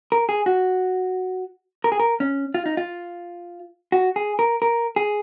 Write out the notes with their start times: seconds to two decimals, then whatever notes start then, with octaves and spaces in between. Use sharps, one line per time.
0.12 A#4
0.29 G#4
0.46 F#4
1.84 A#4
1.92 G#4
2.00 A#4
2.20 C#4
2.54 F4
2.66 D#4
2.77 F4
3.92 F#4
4.16 G#4
4.39 A#4
4.62 A#4
4.96 G#4